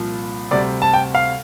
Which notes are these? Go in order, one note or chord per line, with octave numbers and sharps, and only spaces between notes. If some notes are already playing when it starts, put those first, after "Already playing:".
Already playing: C2 A#2 F3
D2 C3 G3 D5
A5
G5
F5